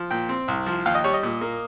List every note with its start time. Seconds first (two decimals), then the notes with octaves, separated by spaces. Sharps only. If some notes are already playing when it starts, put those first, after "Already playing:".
Already playing: F3
0.11 A#2 G5
0.29 C4
0.48 C2
0.66 F3
0.86 D#2 F5
0.95 D#5
1.04 G3 C#5
1.14 D#5
1.23 A#2
1.41 A#3